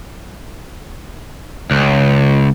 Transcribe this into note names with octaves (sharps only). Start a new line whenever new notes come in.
C#2